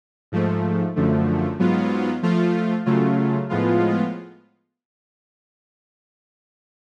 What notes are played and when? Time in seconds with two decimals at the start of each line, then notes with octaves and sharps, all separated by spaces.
0.32 G#2 F3 A3
0.96 F#2 D3 F3 A3
1.59 G#2 F#3 B3 F4
2.23 F3 A3 F4
2.86 C#3 F#3 A3 F4
3.50 A2 F3 G#3 B3 F4